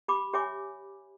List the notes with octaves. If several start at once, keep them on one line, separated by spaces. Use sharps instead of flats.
G4 B5 D6
G4 C#5 E5 G#5 D6